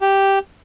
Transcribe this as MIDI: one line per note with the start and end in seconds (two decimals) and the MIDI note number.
0.01 0.39 67